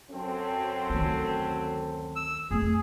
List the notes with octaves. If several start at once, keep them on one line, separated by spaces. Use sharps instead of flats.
F#2 C4 A4
D2 D#3
E6
F2 A3 G#4